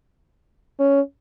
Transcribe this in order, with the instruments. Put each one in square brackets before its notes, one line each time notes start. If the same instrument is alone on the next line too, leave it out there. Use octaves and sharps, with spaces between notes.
[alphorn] C#4